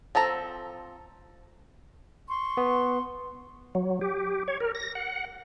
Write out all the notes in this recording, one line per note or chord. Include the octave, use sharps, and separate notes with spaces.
F3 C4 A4 A#5
C6 C#6
B3
F#3
G4
C#5
A#4
A#6
F#5